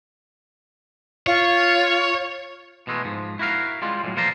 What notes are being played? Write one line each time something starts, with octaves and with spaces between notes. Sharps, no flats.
F4 C#5
B2 E3 G#3 A3
G#2 F3
E4 F#4 A#4 F5
G3 G#3 F4
A2 E3 F#3
E2 A#2 F3 F4 C5 A#5